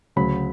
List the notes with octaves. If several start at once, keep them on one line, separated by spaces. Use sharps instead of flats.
D2 C#3 F#3 B5